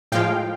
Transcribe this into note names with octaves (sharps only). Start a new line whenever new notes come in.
A2 F3 G#3 F5 G5